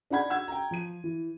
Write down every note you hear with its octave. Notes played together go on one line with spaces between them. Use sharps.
D4 D#4 G#4 F#5 B5 G#6
F#5 E6 G#6
G5 A#5
F3 D#7
E3